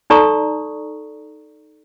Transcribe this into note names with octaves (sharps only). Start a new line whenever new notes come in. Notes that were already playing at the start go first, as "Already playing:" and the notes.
D#4 A4 D5 A#5 C#6 D#6